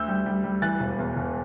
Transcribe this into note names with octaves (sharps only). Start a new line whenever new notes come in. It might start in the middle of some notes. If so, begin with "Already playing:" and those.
Already playing: D2 E6 G6
G3
G3
G3
E3 F#6 A6
E1
E2
E1